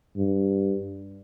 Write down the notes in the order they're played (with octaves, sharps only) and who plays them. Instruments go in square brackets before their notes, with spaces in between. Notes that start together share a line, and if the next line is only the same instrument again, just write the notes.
[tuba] G2